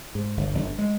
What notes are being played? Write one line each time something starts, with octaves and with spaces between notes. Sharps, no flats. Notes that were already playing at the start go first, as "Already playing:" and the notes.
G#2
G1
G1
G#3